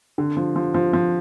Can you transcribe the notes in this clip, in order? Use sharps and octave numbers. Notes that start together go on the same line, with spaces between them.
D3
F3
F3
F3
F3